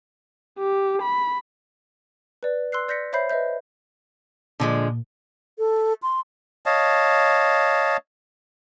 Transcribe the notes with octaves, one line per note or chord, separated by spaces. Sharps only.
G4
B5
B4 D5
C6 E6 F#6 C7
D5 G6 A#6 B6 C#7
C5 C#5 E5 B5 G6 C7
B4 D#5 E5 G6
A#2 D3 F3 G#3
A4
C6
C#5 D#5 F5 A5